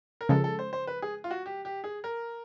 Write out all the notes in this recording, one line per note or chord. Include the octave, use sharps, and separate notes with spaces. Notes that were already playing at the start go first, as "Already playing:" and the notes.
A#4
C#3 F3 G#3 A4
A4
C5
C5
B4
G#4
F4
F#4
G4
G4
G#4
A#4